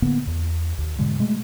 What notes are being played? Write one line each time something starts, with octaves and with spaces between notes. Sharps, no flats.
A2 D3 A#3 B3
E2
D#2
G#2 B2 D3 G#3
B2 G#3 A3